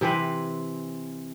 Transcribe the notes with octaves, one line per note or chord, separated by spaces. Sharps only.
C3 E3 C4 B4